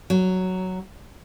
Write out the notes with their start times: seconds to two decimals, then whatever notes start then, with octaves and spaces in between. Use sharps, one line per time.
0.10 F#3